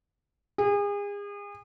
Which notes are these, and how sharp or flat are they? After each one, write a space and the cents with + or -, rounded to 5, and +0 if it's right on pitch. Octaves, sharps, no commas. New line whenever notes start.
G#4 -35